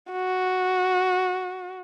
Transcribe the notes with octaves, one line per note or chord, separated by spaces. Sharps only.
F#4